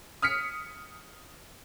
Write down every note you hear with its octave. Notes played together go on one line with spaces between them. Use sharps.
D#6 F6 B6 C#7